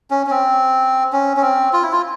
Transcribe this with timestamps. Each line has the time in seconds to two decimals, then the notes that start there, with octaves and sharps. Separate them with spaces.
0.10 C#4
0.27 C#4
0.31 C4
1.12 C#4
1.37 C#4
1.42 C4
1.73 F4
1.83 E4
1.92 F4